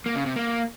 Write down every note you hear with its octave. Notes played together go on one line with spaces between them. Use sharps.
A#3
C#3
C3
A#3